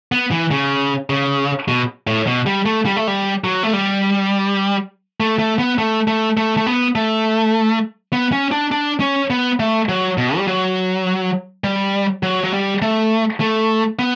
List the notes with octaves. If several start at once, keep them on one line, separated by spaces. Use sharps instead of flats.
B3
E3
C#3
C#3
B2
A2
B2
G3
A3
G3
A3
G3
F#3
A3
G3
A3
A3
B3
A3
A3
A3
A3
B3
A3
B3
C#4
D4
D4
C#4
B3
A3
F#3
B2
G3
F#3
G3
F#3
F#3
G3
A3
A3
B3